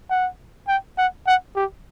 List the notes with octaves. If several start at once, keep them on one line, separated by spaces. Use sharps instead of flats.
F#5
G5
F#5
F#5
G4